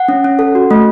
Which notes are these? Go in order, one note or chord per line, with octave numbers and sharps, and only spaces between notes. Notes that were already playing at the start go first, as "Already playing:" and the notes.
Already playing: F#5
C#4
C#4
A4
F#4
A3